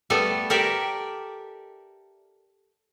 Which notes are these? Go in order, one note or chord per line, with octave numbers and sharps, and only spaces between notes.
G3 A3 B3 A4
G4 A4 A#4 D5 E5 G5